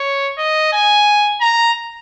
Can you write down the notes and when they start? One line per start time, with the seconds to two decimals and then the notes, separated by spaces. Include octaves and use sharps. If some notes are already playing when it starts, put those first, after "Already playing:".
Already playing: C#5
0.38 D#5
0.73 G#5
1.41 A#5